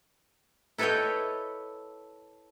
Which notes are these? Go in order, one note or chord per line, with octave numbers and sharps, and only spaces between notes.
E4 A4 B4 C#5 D#5 G5